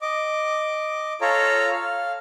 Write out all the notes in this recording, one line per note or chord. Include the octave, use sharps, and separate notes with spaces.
D#5 D6
F4 A4 C#5 A#5
F5